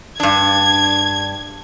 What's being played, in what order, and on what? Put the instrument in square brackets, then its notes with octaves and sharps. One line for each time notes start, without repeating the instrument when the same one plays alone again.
[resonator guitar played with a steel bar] G2 D4 [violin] G#6